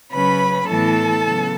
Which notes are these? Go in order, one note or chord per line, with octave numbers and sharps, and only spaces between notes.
C#3 F#3 C#4 B4 B5
A2 E3 B3 A4 A5
C#3 F#3 B3